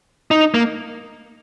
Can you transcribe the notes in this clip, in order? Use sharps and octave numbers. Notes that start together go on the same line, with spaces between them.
D#4
A#3